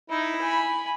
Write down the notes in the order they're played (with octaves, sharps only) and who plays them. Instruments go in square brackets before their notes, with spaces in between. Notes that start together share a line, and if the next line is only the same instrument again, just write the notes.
[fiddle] D#4 [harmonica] E4
[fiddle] G#5 B5